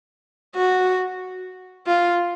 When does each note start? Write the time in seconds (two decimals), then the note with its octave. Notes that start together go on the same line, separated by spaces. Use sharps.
0.56 F#4
1.87 F4